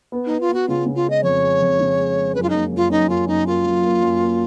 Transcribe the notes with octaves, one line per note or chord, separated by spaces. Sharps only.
B3
B3 D#4
F4
B3 F#4
C#3 F4
C#3
F4
G#3
D#5
F2 C#5
G#3
F2
C#3
G#3
G#3
F#2 B4
F4
A#3 D#4
F#2 F4
F#2 D#4
F#2 F4
F#2 D#4
A#3 F4
F#2
A#3
F#2
A#3